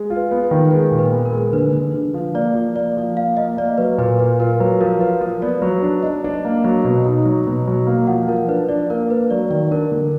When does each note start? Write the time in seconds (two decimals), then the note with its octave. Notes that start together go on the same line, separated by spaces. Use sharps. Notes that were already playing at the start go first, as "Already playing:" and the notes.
Already playing: G#3
0.10 F4
0.16 B4
0.31 B3
0.44 B4
0.51 D#3
0.71 G#3 B4
0.92 A#2
0.99 B4
1.12 B3
1.26 A#4
1.32 G#3
1.53 D3 B4
1.73 D3
1.94 D3
2.14 F3
2.35 A#3 D5
2.55 F3
2.76 A#3 D5
2.97 F3
3.17 A#3 F5
3.37 A#3 D#5
3.57 A#3 D5
3.78 F#3 B4
3.98 A#2 B4
4.19 F4 B4
4.40 F4 A#4
4.60 F#3 B4
4.81 F3 A#4
5.00 F4 B4
5.21 F3 A#4
5.42 B3 D5
5.62 F#3 B4
5.82 D4
6.03 D4 D#5
6.24 D4
6.45 A#3
6.64 F#3
6.84 B2
7.06 D#4
7.25 F#3
7.46 B2
7.67 F#3
7.87 A#3
8.07 F3 F#5
8.28 F3 A#4
8.48 D4 B4
8.69 D4 D5
8.90 A#3 A#4
9.10 A#3 B4
9.30 F#3 D5
9.50 D#3 D5
9.71 D4 A#4
9.92 D3